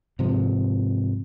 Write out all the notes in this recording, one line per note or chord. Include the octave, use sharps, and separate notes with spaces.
G#2 C3 F3